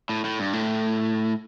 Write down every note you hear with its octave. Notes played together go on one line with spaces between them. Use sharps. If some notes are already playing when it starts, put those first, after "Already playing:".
A2
A2
G2
A2